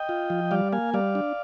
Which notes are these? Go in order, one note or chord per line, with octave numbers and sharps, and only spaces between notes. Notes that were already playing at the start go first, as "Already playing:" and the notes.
Already playing: D#5 G5
F4
F3
G3 D5 F5
A#3 F5 G#5
G3 D5 F5
D4